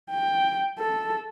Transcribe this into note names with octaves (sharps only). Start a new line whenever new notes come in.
G5
A4